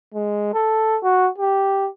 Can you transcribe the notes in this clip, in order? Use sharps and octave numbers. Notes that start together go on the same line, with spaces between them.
G#3
A4
F#4
G4